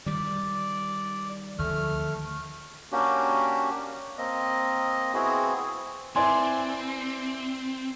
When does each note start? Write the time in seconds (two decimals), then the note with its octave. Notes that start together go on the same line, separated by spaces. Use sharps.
0.06 D#3 G3 D5
1.59 D2 D#3 F3 A3 F6
2.92 A#3 C#4 D4 F#4 G4
4.18 A#3 C4 D#5
5.14 B3 C4 E4 F#4 G#4
6.16 C4 E4 B4 D5 G#5 C6